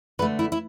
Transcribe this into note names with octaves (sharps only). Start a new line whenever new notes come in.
D3 A3 B4
E4
E4